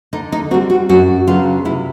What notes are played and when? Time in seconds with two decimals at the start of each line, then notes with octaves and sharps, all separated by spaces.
0.13 D3 D#4
0.32 D#4
0.51 C4 F#4
0.54 G3
0.70 F#4
0.89 F#2 F#4
1.27 C#3 F#3 B3 D4 F4
1.65 C3 E4